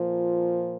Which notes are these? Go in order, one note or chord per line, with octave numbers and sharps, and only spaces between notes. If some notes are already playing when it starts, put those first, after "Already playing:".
Already playing: A#2 F3